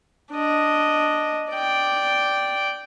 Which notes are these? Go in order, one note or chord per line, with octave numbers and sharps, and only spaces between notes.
D4 D#5
D5 G5